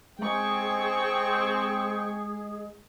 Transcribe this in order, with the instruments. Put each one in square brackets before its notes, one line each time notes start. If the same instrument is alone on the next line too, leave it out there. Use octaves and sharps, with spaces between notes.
[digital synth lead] G#3 [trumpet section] C4 [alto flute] G#4 [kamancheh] G5 C#6